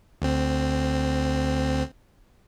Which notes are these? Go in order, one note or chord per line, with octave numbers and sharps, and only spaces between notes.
D2 C4